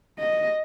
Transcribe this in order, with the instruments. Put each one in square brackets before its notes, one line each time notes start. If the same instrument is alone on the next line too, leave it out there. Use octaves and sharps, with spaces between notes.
[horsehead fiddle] D#5